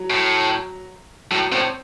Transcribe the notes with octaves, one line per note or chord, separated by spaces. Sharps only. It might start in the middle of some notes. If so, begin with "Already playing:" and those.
Already playing: F#3
A2
A2 F#3
A2 C4